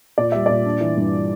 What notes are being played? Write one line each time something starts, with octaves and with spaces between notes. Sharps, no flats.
A#2 D5
G3 E5
A#2 D5
D4
E3
G2